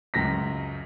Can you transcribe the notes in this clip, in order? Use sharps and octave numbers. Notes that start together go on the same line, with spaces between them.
C#2 F#2 A#6 B6